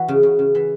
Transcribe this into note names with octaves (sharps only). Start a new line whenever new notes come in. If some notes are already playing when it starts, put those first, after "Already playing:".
Already playing: E3 F#4
C#3
C#3
C#3
E3